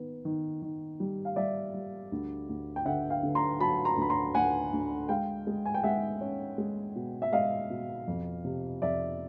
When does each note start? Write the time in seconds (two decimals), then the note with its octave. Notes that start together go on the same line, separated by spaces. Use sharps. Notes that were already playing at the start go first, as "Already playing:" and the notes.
Already playing: D#3 B3
0.25 D#3
0.62 D#3
1.00 G3
1.25 F5
1.36 G3 D5 E5
1.74 G3
2.12 D2
2.49 D2
2.76 G5
2.85 D3 E5 F#5
3.10 F5 G5
3.23 D3
3.35 A#5 C6
3.60 F#3 A5 B5
3.85 A#5 C6
3.97 D2 B5
4.10 A#5 C6
4.35 D2 F#5 G#5
4.72 D2
5.09 G#3 F5 G5
5.47 G#3
5.65 G#5
5.74 G5
5.83 G#3 E5 F#5
6.21 C#4
6.58 G#3
6.96 B2
7.22 E5
7.33 G#3 D#5 F5
7.70 B2
8.07 F2
8.44 C3
8.82 F2 D5 E5